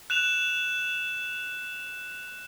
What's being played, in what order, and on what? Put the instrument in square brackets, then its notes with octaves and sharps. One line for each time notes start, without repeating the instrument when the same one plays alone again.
[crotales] F#6 E7 F7